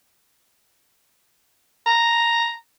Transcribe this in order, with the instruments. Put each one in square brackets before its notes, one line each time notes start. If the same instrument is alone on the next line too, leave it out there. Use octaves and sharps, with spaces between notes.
[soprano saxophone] A#5